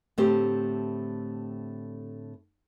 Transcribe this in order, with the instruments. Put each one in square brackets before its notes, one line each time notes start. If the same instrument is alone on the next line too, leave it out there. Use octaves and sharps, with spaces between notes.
[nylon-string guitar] A2 D3 A3 C4 G4 C5